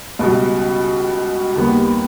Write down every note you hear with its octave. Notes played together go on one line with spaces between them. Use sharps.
C#2 B2 G3
D#2 D#3 G3 B3